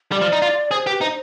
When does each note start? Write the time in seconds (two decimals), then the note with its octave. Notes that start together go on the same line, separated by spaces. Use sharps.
0.12 G3 D5
0.22 F3
0.33 D#4
0.42 F4
0.71 G#4 C5
0.87 G4 B4
1.01 D#4 C5